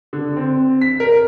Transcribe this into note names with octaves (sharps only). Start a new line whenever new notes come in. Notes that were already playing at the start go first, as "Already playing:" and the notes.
D3
C4
B6
A#4